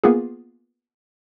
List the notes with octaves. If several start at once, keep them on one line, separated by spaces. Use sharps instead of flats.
A#3 B3 F4 G#4